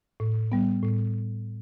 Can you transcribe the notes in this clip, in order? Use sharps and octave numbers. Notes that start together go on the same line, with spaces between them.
A2
G3 B3
A2